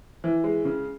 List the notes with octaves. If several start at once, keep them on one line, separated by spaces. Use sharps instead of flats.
E3
G#3
C#3